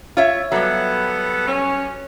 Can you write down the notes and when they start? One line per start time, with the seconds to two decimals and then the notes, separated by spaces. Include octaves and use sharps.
0.17 F4 C#5 E5
0.52 F#3 G3 B3 A4
1.47 C#4